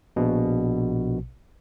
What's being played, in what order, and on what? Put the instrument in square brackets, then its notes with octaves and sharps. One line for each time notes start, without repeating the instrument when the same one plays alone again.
[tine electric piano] A#1 B2